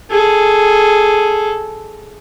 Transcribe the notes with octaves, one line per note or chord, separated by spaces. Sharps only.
G#4 A4